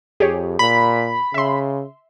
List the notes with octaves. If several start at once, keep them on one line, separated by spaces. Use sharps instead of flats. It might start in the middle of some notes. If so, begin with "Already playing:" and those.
F2 G4 G#4 C#5
A#2 B5
C#3 E5 C6